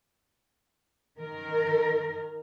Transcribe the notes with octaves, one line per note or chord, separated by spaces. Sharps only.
D#3 A#4